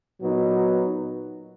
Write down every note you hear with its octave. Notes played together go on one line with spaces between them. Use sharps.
A#2 F#3 B3 D#4